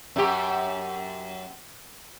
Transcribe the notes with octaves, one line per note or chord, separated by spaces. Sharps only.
F#2 G4